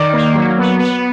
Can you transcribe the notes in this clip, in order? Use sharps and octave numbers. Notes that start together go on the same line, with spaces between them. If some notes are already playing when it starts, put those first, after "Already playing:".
Already playing: D#3 D5
A#3
F#3
B3
B3